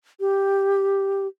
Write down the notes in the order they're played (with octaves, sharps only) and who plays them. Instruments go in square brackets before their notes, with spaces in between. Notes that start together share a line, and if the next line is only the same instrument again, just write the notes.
[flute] G4